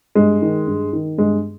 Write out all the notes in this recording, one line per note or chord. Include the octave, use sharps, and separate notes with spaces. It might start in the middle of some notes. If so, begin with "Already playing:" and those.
G2 G#3
D#3
G2
D#3
G2 G#3